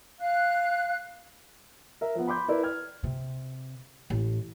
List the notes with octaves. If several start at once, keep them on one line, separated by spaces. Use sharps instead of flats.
F5 F#6
A#4 E5
F3 B3
B5 C6 D6 G6
E4 A#4 B4 D5
F6 G#6
C3
A1